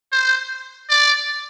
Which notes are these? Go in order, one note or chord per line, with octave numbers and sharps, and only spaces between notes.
C5
D5